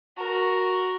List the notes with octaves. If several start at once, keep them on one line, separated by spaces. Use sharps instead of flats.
F#4 A#4